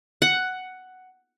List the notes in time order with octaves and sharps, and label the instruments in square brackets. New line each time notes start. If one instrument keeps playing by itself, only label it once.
[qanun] F#5